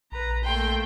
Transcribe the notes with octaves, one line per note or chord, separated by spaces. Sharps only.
A#1 B4 A#5
A3 A#3 G5 C6